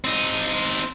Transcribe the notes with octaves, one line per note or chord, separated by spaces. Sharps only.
C4 D#4